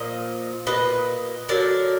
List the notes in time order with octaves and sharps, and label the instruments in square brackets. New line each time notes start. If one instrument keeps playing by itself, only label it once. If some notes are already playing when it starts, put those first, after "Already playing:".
Already playing: [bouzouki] A#2 F3 A#3 D#5
A#2 F3 A#3 B4 D#5
D3 F#3 B3 A#4 D5